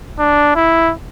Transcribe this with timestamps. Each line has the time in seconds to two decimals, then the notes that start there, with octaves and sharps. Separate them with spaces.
0.19 D4
0.56 E4